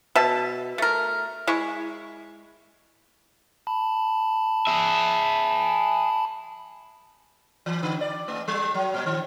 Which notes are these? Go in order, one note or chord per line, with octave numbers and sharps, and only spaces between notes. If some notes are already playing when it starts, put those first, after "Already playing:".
B2 E5 A5
A3 A#4
G#3 E4 C#6
A5 B5
G#4 E5
E3
D3
D5
A3
G3
F#3
A#2
D#3